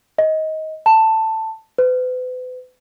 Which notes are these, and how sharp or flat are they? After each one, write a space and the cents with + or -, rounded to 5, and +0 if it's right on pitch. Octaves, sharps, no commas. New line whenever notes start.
D#5 +15
A5 +10
B4 +40